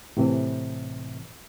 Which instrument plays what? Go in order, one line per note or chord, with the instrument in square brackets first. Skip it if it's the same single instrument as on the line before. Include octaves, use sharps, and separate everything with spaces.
[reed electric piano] A2 C3 E3